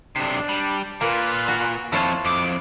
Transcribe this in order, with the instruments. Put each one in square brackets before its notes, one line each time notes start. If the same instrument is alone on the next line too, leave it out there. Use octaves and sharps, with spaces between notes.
[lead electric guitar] B1 C3 [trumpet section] D4
[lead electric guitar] G3
[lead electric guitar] A#2 [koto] A#3 [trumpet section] F4 B4
[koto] F#4
[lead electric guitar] F2 [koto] E4 F4 [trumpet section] C#5 A5
[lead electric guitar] F2 [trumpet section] D6